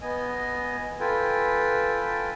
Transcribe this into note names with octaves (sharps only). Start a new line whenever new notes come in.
B3 D#5 G#5
F4 A4 B4 G5 G#5